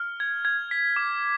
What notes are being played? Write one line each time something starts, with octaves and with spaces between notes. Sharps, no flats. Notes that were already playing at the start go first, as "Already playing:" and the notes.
Already playing: F6
G#6
G#6
B6
D6